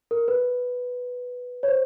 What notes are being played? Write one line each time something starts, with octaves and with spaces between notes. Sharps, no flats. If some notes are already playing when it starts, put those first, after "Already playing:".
A#4
B4
C#5
C5